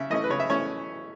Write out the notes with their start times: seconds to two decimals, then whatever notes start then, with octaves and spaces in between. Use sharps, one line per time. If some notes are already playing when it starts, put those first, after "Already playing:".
Already playing: C#3 E5
0.10 E3 A3 C#4 E4 D#5
0.24 B4
0.30 C#3 C#5
0.40 E5
0.49 E3 A3 C#4 E4 C#5